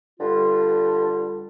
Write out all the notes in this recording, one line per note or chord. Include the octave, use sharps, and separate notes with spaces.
G2 D3 G3 F4